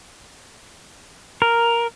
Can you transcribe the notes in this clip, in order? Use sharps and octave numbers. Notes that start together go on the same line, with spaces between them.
A#4